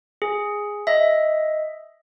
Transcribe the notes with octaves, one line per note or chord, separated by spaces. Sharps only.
G#4
D#5 E5